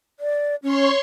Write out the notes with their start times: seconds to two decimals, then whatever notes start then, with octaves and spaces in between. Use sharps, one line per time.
0.20 D5
0.63 C#4 C#5 C6 C#6